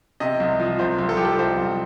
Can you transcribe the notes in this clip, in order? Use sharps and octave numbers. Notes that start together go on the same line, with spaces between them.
C3 D#5
C2
F3
C2 C5
C2
A4
F3 G4
A4
C2 C5
C2